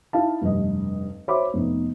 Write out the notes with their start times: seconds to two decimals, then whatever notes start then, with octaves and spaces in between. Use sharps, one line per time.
0.13 D#4 E4 F5 A5
0.41 F1 G2 D#5
1.28 F#4 C5 C#5 E5 B5 D6
1.54 F1 B3 D#4